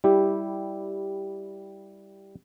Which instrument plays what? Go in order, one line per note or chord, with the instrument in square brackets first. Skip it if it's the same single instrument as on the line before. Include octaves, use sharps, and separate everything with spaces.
[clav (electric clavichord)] G3 E4 G4